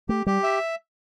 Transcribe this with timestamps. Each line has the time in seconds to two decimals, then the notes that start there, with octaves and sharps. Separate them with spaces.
0.09 A3 G4
0.26 G3 G4
0.43 E5